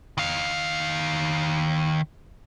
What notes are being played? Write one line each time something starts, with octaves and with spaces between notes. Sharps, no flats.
D#3 F5